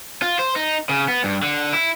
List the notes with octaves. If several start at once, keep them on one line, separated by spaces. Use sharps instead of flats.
F4
C5
D#4
C#3
B3
G2
D3
E4